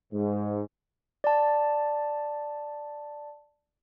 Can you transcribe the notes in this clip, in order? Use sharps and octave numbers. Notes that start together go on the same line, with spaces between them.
G#2
D5 A5